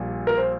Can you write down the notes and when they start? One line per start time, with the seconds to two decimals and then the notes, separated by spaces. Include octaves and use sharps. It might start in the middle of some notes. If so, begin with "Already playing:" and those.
Already playing: A#1 A#2 G3
0.27 A#4
0.38 C5